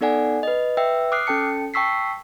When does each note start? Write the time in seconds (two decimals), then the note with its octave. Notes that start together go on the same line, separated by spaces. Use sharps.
0.01 B3 D#4 A4 D5 F#5 G#5
0.43 B4 D#5
0.77 B4 E5 G5 E6
1.12 D6 D#6 F6 F#6 C7
1.27 C#4 A4 G5 A5 C#7
1.74 G5 A5 C#6 E6 B6 C7